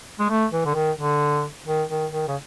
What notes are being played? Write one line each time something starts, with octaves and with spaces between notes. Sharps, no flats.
G#3
A3
E3
D3
D#3
D3
D#3
D#3
D#3
C#3